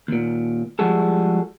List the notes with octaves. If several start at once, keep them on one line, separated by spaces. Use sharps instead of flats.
D#2 A#2
F3 G3 G#3 F#4 G#4 A4